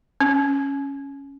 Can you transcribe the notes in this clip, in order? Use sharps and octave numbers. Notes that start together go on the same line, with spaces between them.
C#4